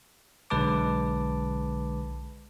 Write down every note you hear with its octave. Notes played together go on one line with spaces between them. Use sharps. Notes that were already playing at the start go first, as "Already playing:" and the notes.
B1 D3 G#3 B4 A5 D6